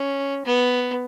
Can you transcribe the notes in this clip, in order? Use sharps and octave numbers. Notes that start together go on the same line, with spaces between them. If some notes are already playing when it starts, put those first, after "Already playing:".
Already playing: C#4
B3